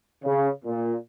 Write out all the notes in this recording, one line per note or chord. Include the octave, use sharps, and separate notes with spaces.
C#3
A#2